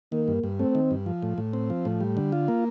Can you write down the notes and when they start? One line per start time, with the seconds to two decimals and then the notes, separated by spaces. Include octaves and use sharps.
0.12 D#3 A#3
0.28 G2
0.44 G2
0.59 A3 C4
0.75 D#3
0.91 G2
1.06 F3
1.22 A2
1.38 A2
1.53 C4
1.70 F3
1.85 A2
2.01 G3
2.17 D3
2.32 F4
2.48 A#3